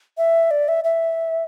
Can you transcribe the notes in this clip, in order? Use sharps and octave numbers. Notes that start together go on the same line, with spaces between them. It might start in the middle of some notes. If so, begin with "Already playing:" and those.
E5
D5
E5
E5